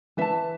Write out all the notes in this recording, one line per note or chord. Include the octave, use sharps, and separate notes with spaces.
E3 B4 E5 A5